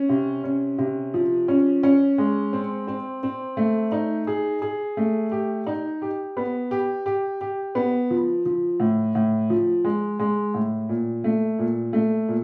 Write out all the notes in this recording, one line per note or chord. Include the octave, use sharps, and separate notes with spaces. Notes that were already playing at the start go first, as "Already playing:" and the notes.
Already playing: C#4
C3
C#4
C3
F3
C#4
C#4
G#3
C4
C4
C4
A3
D#4
G#4
G#4
A3
G4
D#4
G4
B3
G4
G4
G4
B3
F3
F3
A2
A2
F3
G#3
G#3
A2
A#2
A3
A#2
A3
A#2